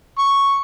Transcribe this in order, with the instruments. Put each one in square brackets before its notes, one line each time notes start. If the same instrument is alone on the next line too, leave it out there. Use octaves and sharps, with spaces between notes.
[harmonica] C#6